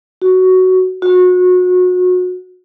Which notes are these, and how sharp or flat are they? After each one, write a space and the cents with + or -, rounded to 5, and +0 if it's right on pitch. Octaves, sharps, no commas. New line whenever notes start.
F#4 +10
F#4 -30